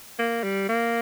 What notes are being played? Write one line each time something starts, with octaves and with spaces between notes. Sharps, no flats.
A#3
G3
A#3